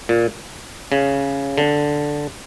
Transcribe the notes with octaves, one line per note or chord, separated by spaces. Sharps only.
A#2
C#3
D3